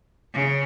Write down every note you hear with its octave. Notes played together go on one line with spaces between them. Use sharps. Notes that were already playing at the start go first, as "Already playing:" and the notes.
C#3